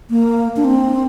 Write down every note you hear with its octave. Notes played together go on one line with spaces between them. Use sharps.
A#3
D4
C4